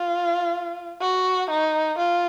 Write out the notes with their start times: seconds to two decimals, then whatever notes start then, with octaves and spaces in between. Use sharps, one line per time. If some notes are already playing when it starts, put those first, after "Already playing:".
Already playing: F4
1.01 F#4
1.50 D#4
1.98 F4